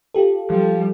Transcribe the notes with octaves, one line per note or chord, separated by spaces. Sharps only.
F4 G4 A4
F3 G3